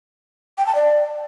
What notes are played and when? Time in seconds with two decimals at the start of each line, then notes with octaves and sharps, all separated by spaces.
0.58 G5
0.66 A5
0.75 D5